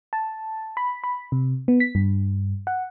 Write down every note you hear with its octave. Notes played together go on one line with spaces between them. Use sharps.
A5
B5
B5
C3
B3
B6
G2
F#5